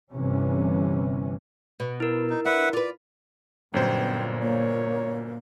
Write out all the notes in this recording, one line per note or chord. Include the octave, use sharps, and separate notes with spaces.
G1 C3 E3 C#4
B2
E4 A#4
D#4
D4 B4 E5 F#5
F4 B4 D5
G1 F#2 A#2 B3 C5 G5
A#3 C#5